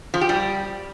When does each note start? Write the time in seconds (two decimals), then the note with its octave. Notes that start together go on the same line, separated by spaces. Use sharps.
0.14 F3
0.21 G4
0.29 G3